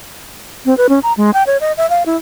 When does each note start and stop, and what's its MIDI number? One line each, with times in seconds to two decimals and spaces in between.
0.66 0.77 60
0.77 0.87 71
0.89 0.99 61
1.03 1.13 82
1.17 1.31 56
1.34 1.43 79
1.47 1.57 73
1.61 1.72 75
1.77 1.88 76
1.90 2.03 77
2.06 2.17 64